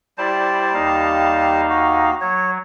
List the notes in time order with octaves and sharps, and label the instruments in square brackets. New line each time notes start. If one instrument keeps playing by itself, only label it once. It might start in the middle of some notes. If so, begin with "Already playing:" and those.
[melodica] G3 A5 [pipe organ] E4 C5 D5
[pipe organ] D#2 D#4 F5
[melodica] F#4
[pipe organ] F#3 [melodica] C#5